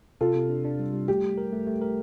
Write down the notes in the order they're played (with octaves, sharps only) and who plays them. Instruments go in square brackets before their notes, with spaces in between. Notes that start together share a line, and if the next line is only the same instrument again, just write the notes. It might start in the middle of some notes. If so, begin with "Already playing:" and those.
[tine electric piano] C3 [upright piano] F4 A4
[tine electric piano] C3
D4
D4
G3
G3
[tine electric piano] A3 [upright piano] G4
[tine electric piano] A3
A#4
A3
A3
A#4